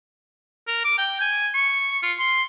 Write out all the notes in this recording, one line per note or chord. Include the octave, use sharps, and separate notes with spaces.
A#4
D6
G5
G#5
C#6
F4
C6